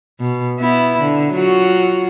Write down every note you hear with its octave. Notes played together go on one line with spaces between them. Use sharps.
B2
B3 E4
D3
F#3 F4 F#4